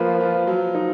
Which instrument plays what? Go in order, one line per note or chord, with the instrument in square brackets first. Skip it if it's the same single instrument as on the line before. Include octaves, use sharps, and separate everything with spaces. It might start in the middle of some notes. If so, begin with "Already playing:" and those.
Already playing: [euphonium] F3 [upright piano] A#3 F4 B4
[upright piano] F4
[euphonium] F3 [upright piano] F#3
[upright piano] D#4